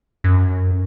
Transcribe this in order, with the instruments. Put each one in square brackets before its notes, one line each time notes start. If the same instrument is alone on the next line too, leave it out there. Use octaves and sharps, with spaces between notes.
[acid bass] F#2